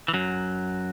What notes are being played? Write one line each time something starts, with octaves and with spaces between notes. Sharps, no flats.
E3
F#2 F#3